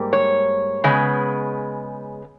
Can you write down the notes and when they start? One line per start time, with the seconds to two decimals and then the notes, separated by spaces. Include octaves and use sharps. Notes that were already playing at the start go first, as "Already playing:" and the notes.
Already playing: G#2 G3 A#3
0.13 C#5
0.84 C#3 G#3 B3